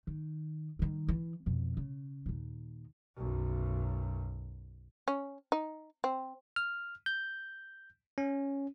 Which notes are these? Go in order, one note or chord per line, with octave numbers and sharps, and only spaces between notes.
D#3
D#3 G3
E3
F2 B2
C#3
D#2 A#2
B1 F#2
C#4
D#4
C4
F6
G6
C#4